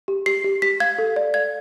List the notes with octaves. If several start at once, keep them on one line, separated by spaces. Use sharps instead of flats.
G4
G4 C7
G4
G4 B6
F5 G#6
A4
D5
F5 G#6